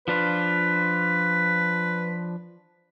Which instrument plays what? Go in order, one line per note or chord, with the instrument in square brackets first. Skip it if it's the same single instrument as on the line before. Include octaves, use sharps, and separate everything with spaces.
[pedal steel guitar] F3 D4 F4 [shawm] B4